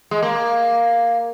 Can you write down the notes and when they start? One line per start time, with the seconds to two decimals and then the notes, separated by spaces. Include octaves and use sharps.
0.11 G#3
0.22 A#3